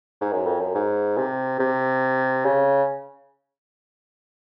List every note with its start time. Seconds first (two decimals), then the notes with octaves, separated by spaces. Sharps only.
0.21 G#2
0.32 F#2
0.46 F2
0.60 F#2
0.75 G#2
1.17 C3
1.60 C3
2.45 C#3